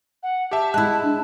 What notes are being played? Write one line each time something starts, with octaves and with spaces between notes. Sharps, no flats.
F#5
G4 E5 A5
G#3 E4 A5 F#6
D4